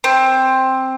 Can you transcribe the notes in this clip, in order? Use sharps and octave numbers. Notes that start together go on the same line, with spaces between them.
C4